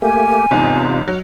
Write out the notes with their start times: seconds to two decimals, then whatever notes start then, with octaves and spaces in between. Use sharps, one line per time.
0.02 A3 A#3 G4 G#5
0.51 G1 E2 G#2 C3 D#4 F4
1.08 F#3 F#5 F6